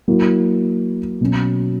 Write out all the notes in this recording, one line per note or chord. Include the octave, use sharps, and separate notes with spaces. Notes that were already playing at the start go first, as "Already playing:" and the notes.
F#3 A#3 E4
B2 F#3 C#4